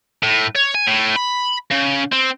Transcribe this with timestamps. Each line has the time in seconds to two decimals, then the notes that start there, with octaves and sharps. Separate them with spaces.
0.23 A2
0.55 C#5
0.74 G#5
0.87 A2
1.16 B5
1.71 C#3
2.12 C4